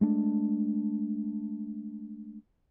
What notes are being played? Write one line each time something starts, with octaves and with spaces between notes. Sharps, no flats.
G#3 A3 D4